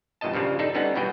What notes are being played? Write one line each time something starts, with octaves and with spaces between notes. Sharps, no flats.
E2 G2 A#2 C#3 D#5 A5
G2 A#2 C#3 F3 G3
D4 D#4 A4 D5
D3 G3 B3 C#4 D#4 F#5
G2 B2 E3 F#4 G#4 G5